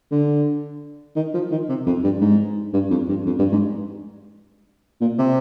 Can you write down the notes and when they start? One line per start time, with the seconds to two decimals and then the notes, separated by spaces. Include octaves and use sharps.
0.11 D3
1.16 D#3
1.34 F3
1.51 D#3
1.69 C3
1.86 F2
2.04 G2
2.21 G#2
2.74 G2
2.91 F2
3.09 G2
3.26 F2
3.39 G2
3.52 G#2
5.01 A#2
5.18 C3